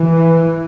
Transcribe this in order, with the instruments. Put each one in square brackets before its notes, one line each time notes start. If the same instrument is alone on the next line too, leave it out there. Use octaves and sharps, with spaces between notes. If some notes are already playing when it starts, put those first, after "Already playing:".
Already playing: [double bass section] E3